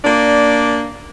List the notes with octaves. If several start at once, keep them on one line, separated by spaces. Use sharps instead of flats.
A#3 D4 D5